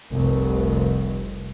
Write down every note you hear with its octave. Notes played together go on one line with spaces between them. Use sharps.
F1 C2